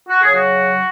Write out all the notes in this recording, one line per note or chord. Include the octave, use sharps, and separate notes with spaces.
F#4
C#3 F#3 G#4
F#4